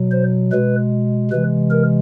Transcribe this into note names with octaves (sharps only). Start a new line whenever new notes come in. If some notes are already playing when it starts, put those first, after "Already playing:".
Already playing: B2 F#3
C5
B2 G#3 B4
C3 E3 G#3 B4
A#4